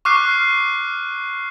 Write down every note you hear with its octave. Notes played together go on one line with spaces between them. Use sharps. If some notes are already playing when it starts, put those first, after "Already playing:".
C#6 D6 F6 F#6 C7 D#7